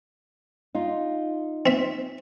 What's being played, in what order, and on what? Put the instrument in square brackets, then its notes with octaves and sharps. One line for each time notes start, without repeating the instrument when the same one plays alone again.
[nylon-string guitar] D#4 F4
[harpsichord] C4 E5